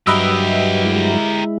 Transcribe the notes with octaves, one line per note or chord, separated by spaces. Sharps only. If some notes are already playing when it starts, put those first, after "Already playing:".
G2 F#3 G4 A#4 B4 D#5 E5
G#3 E4